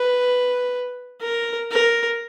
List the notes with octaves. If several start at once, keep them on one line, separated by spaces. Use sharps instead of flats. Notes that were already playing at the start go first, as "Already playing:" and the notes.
Already playing: B4
A#4
A#4